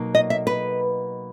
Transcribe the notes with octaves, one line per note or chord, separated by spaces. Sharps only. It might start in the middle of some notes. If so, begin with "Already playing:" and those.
Already playing: B2 F#3 A#3 D#4
D#5
E5
B4